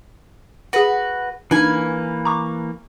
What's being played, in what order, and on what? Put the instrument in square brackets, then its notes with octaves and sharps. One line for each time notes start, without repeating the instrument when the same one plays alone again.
[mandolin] F#4 B4 [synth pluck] G#4 F#5
[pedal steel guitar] E3 A#3 [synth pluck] D4 D#4 [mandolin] B4 G#5
[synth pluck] A#5 C#6 D6